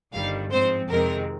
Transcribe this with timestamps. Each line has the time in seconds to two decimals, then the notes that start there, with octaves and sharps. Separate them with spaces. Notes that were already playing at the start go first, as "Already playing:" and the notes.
0.13 G1 G2 D#3 G3 F5
0.51 G#2 F3 G#3 C4 C5
0.89 F2 C3 D#3 G#3 C4 A#4